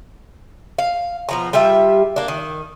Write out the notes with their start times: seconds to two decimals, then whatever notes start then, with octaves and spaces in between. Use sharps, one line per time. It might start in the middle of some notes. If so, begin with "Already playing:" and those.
0.79 F5
1.29 B2 F3 A#5
1.53 G3 F4 G4 E5
2.16 A#3 D4
2.28 D#3